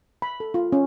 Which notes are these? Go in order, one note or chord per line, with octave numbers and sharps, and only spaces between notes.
B5
A4
F4
C#4